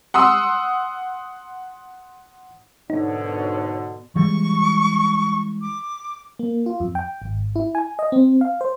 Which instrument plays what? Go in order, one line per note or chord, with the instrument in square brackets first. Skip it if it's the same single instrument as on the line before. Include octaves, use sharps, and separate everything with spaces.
[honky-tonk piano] F#5 C6 D#6 E6
[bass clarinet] G#2 [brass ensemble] B2 D3 [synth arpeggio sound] D#4 [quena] C#5
[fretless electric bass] E3 G3 G#3 [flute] C#6
[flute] D6
[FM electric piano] A#3
F4
F2
G5
G#1
E4
G#5
D#5
C4
F5
C5